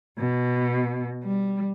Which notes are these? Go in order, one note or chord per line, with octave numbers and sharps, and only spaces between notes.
B2
G3